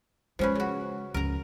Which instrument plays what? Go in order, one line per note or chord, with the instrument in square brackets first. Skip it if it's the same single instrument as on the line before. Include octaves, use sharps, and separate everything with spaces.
[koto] F3 C#4 B4 [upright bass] G#3
[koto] C#3 F#4
[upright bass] C#2 F3 [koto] A#4 A#5